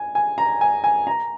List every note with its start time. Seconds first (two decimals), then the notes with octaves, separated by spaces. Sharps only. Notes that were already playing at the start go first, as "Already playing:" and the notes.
Already playing: G#5
0.15 G#5
0.38 A#5
0.61 G#5
0.84 G#5
1.07 A#5